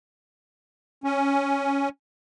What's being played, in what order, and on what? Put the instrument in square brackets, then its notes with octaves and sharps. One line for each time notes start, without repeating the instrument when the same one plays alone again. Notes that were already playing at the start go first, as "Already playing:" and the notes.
[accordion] C#4